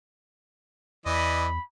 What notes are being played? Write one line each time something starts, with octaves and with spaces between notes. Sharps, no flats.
E2 E3 D5 D#5 B5